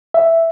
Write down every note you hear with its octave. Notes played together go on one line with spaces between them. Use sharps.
E5